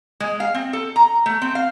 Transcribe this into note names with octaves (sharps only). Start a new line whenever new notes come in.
G#3
F5
C4
A4
A#5
A3
C4
F5